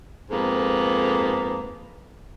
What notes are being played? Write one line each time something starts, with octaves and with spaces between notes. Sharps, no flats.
F2 G#2 A#3 B3 A4